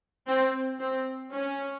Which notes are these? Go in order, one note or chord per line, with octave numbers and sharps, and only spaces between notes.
C4
C4
C#4